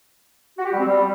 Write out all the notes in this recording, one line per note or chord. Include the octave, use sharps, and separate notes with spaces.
F#4
G4
G3
C4
G3